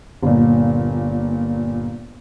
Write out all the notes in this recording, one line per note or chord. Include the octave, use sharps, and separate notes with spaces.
G1 A#2